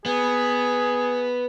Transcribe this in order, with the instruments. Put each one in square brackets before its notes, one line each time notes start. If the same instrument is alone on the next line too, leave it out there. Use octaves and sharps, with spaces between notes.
[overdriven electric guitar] B3 [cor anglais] G#4